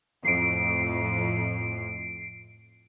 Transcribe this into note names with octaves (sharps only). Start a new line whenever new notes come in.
F2 A2 C7 D7